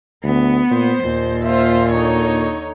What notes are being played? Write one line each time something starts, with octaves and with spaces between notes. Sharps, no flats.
D2 B3
A#2 C5
D#2 A#2
F4 C5 E5
D3 D#4 C#5